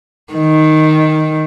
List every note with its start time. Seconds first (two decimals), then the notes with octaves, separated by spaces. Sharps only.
0.34 D#3